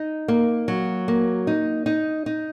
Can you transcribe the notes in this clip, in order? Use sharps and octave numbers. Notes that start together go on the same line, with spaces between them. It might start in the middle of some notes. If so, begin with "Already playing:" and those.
Already playing: D#4
A#3
F#3
A#3
D#4
D#4
D#4